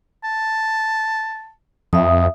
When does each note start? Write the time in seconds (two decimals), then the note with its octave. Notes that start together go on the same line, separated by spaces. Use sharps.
0.24 A5
1.93 F2 E5 D#6